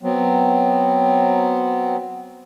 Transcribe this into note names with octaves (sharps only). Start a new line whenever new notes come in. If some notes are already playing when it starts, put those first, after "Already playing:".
F#3 B3 C4